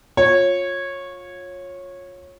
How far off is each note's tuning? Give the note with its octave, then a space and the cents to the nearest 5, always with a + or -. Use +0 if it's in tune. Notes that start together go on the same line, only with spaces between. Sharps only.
F4 +25 C#5 -15